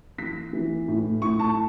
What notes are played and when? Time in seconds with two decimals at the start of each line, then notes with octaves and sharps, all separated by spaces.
0.18 E3 B6
0.53 E3
0.88 A2
1.22 A2 C#6
1.39 A5